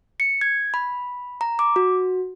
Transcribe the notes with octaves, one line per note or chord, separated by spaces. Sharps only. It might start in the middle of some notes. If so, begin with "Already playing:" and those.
C#7
G#6
B5
A#5
D6
F#4